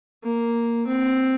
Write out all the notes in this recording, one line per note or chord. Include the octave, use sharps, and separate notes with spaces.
A#3
C4